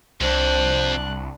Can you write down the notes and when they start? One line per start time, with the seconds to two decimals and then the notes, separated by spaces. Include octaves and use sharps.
0.21 C2 F2 D4 C5 F#6